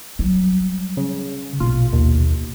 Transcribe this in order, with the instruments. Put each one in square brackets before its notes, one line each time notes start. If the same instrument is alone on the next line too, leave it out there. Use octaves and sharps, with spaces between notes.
[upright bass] F#3 G3
[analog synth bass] C#3
[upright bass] A#1 B2 [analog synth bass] F4
[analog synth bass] D#2